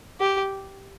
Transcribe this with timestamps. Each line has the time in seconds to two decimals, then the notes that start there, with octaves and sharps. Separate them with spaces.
0.20 G4